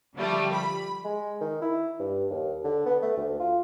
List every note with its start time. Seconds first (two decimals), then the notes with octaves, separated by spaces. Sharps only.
0.15 D3 F3 G3 A3
0.54 B5
1.05 G#3
1.41 D#3
1.62 E4
2.00 G2
2.30 D#2
2.64 D3
2.86 B3
3.02 A3
3.17 D2
3.40 F4